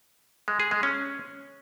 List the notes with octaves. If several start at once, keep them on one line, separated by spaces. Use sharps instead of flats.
G#3
G#4
G#3
C#4